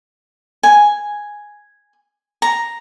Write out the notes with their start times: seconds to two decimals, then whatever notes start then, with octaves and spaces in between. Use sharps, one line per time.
0.63 G#5
2.42 A#5